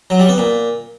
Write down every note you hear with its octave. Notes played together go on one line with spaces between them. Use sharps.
F#3
G3
B3
A#2